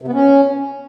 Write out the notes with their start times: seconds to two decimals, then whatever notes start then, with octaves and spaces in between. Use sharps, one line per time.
0.02 C3
0.08 B3
0.14 C#4